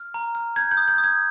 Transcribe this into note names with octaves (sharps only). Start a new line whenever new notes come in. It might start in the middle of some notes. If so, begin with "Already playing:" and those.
Already playing: F6
A#5
F6
G6 G#6
G6
D#6
G6
D#6
G#6